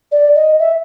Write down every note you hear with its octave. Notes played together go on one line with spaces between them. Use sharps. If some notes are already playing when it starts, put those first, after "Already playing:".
D5
D#5
E5